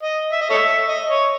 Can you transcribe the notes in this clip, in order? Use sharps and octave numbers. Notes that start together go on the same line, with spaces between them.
D#5
E5
D#5
A4 C#5 E5
D#5
C#5